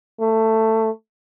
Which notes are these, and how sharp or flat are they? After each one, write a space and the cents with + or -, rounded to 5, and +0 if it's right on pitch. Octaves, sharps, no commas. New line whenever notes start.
A3 +15